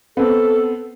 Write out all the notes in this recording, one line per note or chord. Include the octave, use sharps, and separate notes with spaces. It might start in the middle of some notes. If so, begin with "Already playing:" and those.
B3 C4 A4